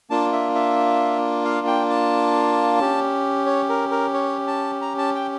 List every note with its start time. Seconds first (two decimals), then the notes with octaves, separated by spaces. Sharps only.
0.10 A#3 D4 F4 A5
0.32 E5
0.55 E5
1.44 F5
1.67 G5
1.90 A5
2.79 C#4 G4
3.46 C#5
3.69 A#4
3.91 A#4
4.14 C#5
4.48 A5
4.82 A#5
4.98 A5
5.15 G5